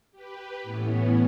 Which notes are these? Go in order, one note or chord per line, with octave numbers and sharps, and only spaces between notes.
G4 B4
A2 E3 B3 C#4